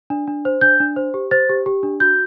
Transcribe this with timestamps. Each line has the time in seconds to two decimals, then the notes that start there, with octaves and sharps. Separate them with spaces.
0.10 D4
0.27 D4
0.45 C5
0.61 D4 G6
0.80 D4
0.96 C5
1.14 G4
1.31 C5 A6
1.49 G4
1.66 G4
1.83 D4
2.00 F#4 G6